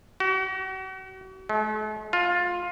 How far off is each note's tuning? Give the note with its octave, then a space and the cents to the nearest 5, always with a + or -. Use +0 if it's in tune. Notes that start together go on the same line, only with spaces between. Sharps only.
F#4 +40
A3 -45
F4 +15